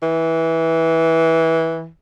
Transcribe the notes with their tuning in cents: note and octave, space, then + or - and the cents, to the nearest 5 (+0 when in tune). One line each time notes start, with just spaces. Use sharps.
E3 -15